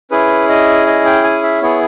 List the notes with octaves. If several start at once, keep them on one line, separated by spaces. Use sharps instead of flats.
C#4 E4 G#4 B4
D#5
D#5
G5
G#5
E5
B3 E4 G#4 C#5